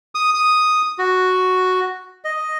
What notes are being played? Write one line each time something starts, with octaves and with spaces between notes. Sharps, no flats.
D#6
D#6
F#4
D#5